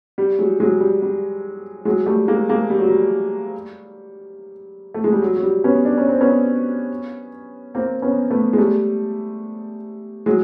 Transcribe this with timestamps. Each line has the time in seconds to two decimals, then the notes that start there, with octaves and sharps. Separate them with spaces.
0.18 G3
0.39 F#3 G#3
0.60 F#3 G#3
0.80 G3
1.02 G3
1.85 F#3 G#3
2.06 G3 A3
2.28 G#3 A#3
2.49 G#3 A#3
2.70 G3
2.79 F#3
2.88 G3
4.94 A3
5.04 G#3
5.13 G3
5.22 F#3
5.36 F#3
5.43 G3
5.64 B3 C#4
5.85 D4
5.97 C#4
6.09 C4
6.21 B3 C#4
7.75 A#3 C4
8.02 B3 C#4
8.30 A3 B3
8.53 G#3
8.58 G3 A3
10.26 F#3 G#3